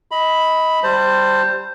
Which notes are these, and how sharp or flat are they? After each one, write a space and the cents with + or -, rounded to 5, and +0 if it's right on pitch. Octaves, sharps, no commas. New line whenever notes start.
D#5 +30 B5 +0
G3 +0 C5 +0 A5 +30